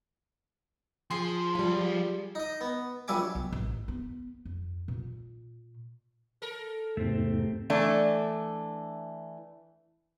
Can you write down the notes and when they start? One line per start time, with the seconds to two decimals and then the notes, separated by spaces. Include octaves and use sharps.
1.10 F3 G#4 C6
1.55 G3 F4
2.35 D#4 D#5
2.61 B3
3.08 A#1 F#3 G3 E5 G#5 D6
3.35 B1
3.52 A1
3.88 B3
4.45 F2
4.88 A#2
6.42 A4 A#4
6.97 E2 G#2 C3 A3 C4
7.70 E3 A3 D4